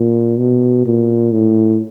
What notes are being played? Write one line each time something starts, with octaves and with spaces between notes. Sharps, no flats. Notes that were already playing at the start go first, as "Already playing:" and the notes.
Already playing: A#2
B2
A#2
A2